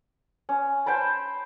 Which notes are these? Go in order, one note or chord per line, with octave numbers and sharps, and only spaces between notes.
C#4
C5 G5 A5 B5